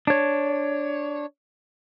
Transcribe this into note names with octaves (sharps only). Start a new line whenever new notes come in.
D4 C#5